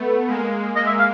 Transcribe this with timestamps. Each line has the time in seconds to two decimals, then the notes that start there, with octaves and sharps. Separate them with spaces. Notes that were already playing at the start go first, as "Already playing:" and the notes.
Already playing: A3 B3
0.27 G#3 A#3
0.75 G#3 A#3 D#5
0.87 E5
0.99 F5